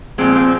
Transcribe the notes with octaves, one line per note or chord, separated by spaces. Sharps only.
A#2 F3 G#3 C4
C4